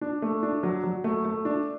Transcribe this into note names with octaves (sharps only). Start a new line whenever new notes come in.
D4
A3
D4
F#3
F#3
A3
A3
D4